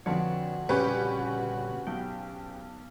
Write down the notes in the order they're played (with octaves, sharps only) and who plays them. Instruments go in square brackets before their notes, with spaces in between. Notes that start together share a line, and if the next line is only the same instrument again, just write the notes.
[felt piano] F2 D3 F3 [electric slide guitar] D4 B4 C#5 [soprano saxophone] F#4
[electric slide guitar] A#2 C#3 G3 [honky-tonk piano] C#4 G4 B4
[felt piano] B1 [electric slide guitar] G5